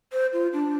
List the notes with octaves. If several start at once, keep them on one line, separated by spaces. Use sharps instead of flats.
C5
F4
D4